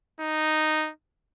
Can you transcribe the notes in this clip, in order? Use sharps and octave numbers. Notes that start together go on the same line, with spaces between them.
D#4